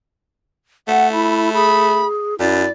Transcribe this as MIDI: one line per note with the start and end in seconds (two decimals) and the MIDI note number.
0.88 2.04 57
0.88 1.11 78
1.13 1.54 64
1.13 1.49 83
1.54 2.38 68
1.54 2.07 83
2.40 2.64 42
2.40 2.66 64
2.40 2.72 74